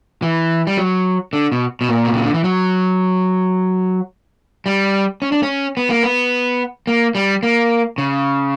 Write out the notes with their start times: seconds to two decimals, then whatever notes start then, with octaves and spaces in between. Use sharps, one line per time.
0.22 E3
0.67 G3
0.78 F#3
1.33 D3
1.52 B2
1.81 B2
1.89 A#2
2.05 B2
2.13 C#3
2.24 D3
2.34 E3
2.44 F#3
4.66 G3
5.22 C#4
5.32 D4
5.43 C#4
5.77 B3
5.90 A#3
6.03 B3
6.87 A#3
7.15 G3
7.43 A#3
7.98 C#3